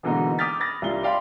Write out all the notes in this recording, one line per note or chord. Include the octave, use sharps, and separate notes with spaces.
B2 D3 E3 G#3 A#3 D#4
D6 D#6 F6 G6 A6 B6
B5 D#6 A6 A#6
C2 G3 D4 F4 C7 G7
D5 E5 F5 G5 B5 C6